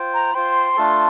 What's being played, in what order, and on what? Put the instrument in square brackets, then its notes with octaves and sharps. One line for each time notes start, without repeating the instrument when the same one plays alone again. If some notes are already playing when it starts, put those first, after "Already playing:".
Already playing: [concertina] F4 C5 G5
[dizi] A#5
[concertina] F4 C5 G5 [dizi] C6
[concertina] A3 D4 F4 A4